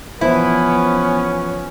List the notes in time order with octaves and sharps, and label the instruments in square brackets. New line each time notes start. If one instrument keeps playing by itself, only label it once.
[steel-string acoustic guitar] E3 F3 C5 [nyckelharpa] B3 [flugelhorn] C#4 [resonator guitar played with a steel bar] E4